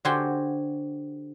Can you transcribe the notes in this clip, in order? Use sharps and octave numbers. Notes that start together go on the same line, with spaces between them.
D3 F#4 G4 C5 G#5 C6